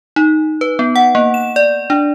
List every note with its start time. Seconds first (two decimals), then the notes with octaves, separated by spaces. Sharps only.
0.16 D#4
0.61 B4
0.79 B3
0.96 F#5
1.15 A#3
1.34 E7
1.56 D5
1.90 D4